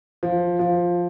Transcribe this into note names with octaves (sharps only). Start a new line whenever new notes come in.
F3
F3